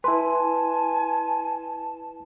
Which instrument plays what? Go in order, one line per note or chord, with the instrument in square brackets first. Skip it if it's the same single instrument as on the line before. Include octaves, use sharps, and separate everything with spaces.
[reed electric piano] E4 B4 [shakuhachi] G#5 [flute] A5 [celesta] C6